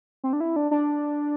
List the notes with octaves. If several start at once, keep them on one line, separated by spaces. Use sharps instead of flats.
C4
D4
E4
D4
D4